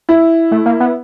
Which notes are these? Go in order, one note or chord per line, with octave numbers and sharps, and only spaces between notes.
E4
A3
A#3
B3